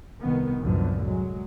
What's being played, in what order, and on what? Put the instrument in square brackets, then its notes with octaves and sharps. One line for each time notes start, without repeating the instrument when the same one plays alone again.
[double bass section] C2 D#3 B3
C2 F#2 A2 D3 F3 B3
F#3 G#3